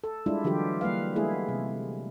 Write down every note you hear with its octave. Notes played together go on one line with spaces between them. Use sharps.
A4
G3 G#3 D4 E4 F4
D3 E3 F#3 F4 G4 A4
G3 A#3 B4 F5
G#3 A3 B3 E4 G#4
C3